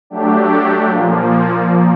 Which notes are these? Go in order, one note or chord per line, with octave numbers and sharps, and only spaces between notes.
F#3 A3 D4 G4
A#2 F3 A#3